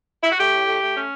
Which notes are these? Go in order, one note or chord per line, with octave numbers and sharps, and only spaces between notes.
E4
F#4
A3 G4
A2
A3
A3
C#4